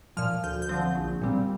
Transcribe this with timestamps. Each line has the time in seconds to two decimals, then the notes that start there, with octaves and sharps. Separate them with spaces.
0.17 A#2 F3 F6
0.44 D2 G6
0.62 G6
0.69 D3 F3 C4
0.95 A#1
1.22 A#2 G3 C4